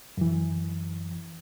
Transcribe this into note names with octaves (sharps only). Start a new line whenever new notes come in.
F#2 E3